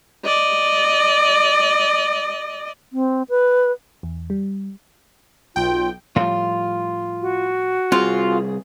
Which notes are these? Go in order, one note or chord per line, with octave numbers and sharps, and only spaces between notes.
D5 D#5
C4
B4
E2
G3
B1 F4 G5
A2 F3 G3 F4
F#4
C2 C4 F4 G#4